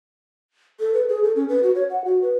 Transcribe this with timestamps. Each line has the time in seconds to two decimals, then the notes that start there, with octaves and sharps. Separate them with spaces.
0.80 A4
0.94 B4
1.09 G#4
1.23 A4
1.36 C#4
1.49 B4
1.63 F#4
1.75 C#5
1.90 F#5
2.05 F#4
2.22 B4